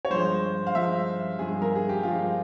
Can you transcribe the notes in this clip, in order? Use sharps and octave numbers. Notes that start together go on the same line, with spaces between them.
C#5
G2 F3 G#3 C5
F5
G2 F3 G#3 E5
G2 F3 G#3 G#4
A#4
G#4
G4
G2 F3 G#3 F4